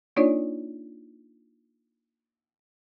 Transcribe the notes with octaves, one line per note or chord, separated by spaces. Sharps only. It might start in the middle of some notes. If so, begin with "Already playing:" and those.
A#3 D4 D#4 F4 C#5 D5